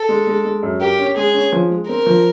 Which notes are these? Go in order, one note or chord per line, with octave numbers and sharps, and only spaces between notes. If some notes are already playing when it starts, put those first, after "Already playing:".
Already playing: A4
G#3
G#3
G#3
F#2
G4 A#4
C#4
G#3 G#4
C#4
F3
G#3
C4 A#4
F3